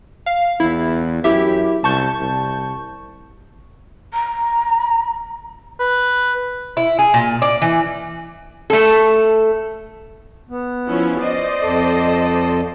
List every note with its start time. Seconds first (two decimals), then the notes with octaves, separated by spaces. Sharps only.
0.26 F5
0.60 E2 E4
1.24 F#2 E4 G4 E5
1.84 C2 A5 C#6 G6
2.21 C2
4.13 A#5
5.80 B4
6.77 E4
6.99 G#4
7.14 A#2
7.42 D5
7.62 E3
8.70 A3 A4
10.49 B3
10.88 F3 C#4 E4
11.21 C5 D5 D#5
11.62 F2 A4